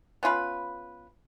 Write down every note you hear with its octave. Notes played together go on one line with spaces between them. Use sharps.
B3 C#4 F4 B4